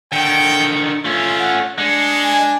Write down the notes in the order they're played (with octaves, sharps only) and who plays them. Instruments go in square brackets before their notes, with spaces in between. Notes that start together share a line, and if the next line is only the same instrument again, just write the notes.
[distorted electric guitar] D3 D#3 [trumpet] G5 [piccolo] C#7
[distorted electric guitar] A3 C#4 [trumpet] F4
[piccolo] F#5
[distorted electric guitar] G#3 [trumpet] D4 [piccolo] C#7
[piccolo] G#5